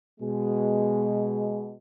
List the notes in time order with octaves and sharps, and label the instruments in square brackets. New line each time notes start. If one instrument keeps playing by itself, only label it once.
[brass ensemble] B2 G#3